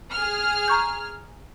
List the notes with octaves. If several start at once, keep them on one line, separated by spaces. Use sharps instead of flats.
G#4 F6
A#5 C#6 G6